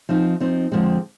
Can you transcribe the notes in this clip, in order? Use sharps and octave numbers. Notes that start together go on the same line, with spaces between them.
F3 C4 D#4
F3 C4 D#4
F2 D3 F3 G#3 C4